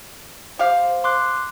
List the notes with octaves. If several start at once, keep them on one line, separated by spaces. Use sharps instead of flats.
G4 C5 F5
C6 D6 F#6